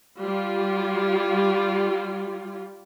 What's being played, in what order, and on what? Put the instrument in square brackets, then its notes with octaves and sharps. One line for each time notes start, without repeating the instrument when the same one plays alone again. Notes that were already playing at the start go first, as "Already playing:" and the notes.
[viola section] G3 F4